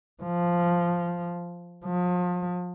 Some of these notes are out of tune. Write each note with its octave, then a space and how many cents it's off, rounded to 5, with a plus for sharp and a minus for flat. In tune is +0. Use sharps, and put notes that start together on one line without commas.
F3 -5
F3 +35